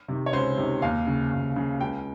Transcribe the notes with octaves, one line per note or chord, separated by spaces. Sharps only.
C3 D#3
C#5
C#2 C5
C3 D#3
D#2 F5
C#3
D#2
C#3
C#2 G5